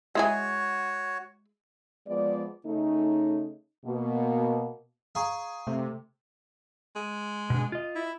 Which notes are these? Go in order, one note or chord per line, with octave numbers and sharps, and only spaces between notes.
G#3 E4 F#4 G#4 C#5
F3 G#3 B3 D5
C#3 A3 C#4 D#4
B2 A#3
G#4 F5 A#5 C#6
C3 A3
G#3
B2 D4
F4 D#5
E4